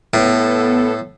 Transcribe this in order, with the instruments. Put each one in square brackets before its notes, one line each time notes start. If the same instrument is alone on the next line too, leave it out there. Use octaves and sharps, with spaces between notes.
[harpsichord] A2 [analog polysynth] B3 A4